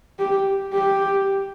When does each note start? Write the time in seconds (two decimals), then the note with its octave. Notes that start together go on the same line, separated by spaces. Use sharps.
0.19 G4
0.74 G4